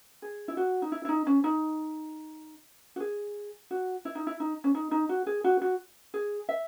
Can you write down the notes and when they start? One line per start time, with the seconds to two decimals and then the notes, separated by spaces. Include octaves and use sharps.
0.22 G#4
0.48 E4
0.57 F#4
0.82 D#4
0.92 E4
1.05 E4
1.09 D#4
1.27 C#4
1.44 D#4
2.96 F#4
3.00 G#4
3.71 F#4
4.05 E4
4.15 D#4
4.27 E4
4.40 D#4
4.64 C#4
4.75 D#4
4.91 D#4
5.09 F#4
5.27 G#4
5.44 F#4
5.62 F#4
6.14 G#4
6.49 E5